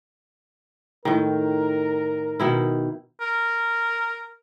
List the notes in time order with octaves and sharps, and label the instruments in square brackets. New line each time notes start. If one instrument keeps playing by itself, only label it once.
[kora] A2 D#3 [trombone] A#4
[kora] B2 D#3 E4
[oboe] A#4